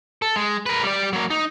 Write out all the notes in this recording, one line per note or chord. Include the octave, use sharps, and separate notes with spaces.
A4
G#3
A#4 B4
G3 D5
F#3 A#3
D#4